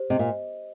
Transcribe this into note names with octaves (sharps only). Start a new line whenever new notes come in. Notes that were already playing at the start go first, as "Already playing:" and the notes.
Already playing: G4 C5
C3 D#5
A#2